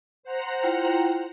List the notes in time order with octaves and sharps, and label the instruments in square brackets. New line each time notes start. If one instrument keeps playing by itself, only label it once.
[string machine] C5 F#5 A#5
[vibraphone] E4 F4 G5